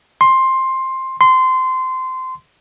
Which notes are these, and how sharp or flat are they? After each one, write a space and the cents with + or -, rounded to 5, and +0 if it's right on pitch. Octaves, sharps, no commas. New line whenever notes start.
C6 +10
C6 -20